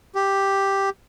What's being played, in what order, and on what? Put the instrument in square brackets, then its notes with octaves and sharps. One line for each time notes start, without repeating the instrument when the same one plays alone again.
[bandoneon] G4